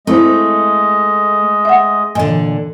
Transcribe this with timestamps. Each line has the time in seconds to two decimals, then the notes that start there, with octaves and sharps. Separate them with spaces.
0.07 G#3 A3 C4 E4 C5 D#5
1.65 E5 F#5
2.15 A#2 D3 E3 D#5 G#5